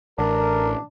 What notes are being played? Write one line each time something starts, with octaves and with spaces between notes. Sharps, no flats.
A1 D4 A#4